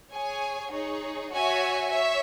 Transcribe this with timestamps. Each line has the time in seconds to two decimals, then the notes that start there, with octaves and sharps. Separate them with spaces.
0.11 G#4 C#5 G#5
0.71 D#4 G#4 C#5
1.31 F#4 C#5 E5 G#5
1.91 C#5 E5